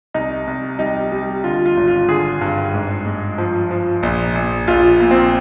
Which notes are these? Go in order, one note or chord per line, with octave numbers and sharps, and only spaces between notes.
C2 D#4
C2
G3 D#4
G3
D3 F4
F4
G#1
F4
D3 G#4
G2
G#2
G#3
F3
F3
A#1
A#1
A#1 F4
A#2
C4